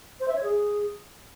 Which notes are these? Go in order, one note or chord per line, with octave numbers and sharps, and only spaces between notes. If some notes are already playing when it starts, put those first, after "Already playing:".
C5
E5
C#5
G#4